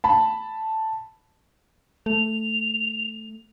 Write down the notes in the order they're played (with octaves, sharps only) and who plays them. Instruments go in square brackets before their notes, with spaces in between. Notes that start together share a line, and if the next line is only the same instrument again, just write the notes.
[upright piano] A5 B5
[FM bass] A3 [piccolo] F7